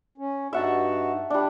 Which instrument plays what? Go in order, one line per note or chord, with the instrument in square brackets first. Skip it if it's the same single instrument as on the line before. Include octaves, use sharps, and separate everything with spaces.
[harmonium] C#4
[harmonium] G2 D#4 F#4 [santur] E5 F#5 A5
[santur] G3 D4